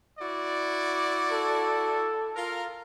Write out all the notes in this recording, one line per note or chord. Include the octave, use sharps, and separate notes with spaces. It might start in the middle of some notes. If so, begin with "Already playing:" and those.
E4 F#4 D5
A4
F4 A#4